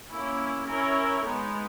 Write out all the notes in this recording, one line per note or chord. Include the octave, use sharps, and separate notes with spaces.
A#3 C#4 E4
C#4 E4 A#4 C#5
G#3 B3 D#4